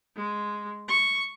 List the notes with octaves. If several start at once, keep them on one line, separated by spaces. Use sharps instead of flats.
G#3
C#6